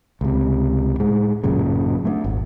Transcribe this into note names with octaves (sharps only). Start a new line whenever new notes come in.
C#2 C3
A2 G#3
A1 F#2 A#2 C#3
A3 A#3 D4
D#1 G#1